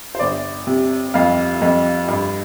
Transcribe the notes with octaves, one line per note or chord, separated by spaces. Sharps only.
C5
G1 D5
C3
F2 F5
F2
G2